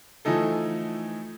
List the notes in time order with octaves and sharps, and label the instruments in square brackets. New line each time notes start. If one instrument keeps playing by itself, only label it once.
[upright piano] E3 F3 A3 D#4 A4